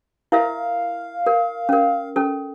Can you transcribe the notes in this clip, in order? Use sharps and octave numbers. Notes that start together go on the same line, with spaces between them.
E4 A#4 E5 F5
A#4
C#4 A#4
C#4 A4